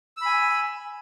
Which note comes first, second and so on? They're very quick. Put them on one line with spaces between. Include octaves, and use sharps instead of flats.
E6 B5 G#5